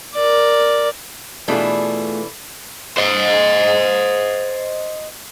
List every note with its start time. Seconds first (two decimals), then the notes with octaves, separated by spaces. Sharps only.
0.14 A#4 D5
1.48 B2 E3 A3 D4 F4 G#4
2.97 C5 D#5